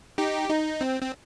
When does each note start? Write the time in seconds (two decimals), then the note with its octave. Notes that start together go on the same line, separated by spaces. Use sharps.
0.18 D#4 G4
0.50 D#4
0.81 C4
1.02 C4